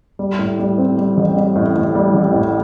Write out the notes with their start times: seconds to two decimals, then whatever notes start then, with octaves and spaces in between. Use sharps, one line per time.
0.19 G3
0.39 A2
0.59 G3
0.78 C4
0.97 G3
1.17 A1
1.36 G3
1.55 A2
1.75 A2
1.95 G3
2.14 A1
2.34 A2